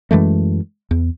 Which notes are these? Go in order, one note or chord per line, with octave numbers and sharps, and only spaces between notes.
F#2 E3 G#3 A3
E2